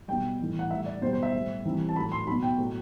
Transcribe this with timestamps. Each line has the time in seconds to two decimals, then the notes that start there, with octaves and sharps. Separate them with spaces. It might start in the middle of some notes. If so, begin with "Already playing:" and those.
0.08 B2 G3 G5
0.40 A2 E3 G3
0.59 F#5
0.71 A2 G3 E5
0.86 D5
1.02 B2 G3 C5
1.13 C5
1.23 E5
1.34 A2 G3
1.65 C3 E3 G3
1.89 A5
1.96 A2 F#3 B5
2.12 C6
2.27 F#3 B5
2.32 B2
2.43 G5
2.59 A2 F#3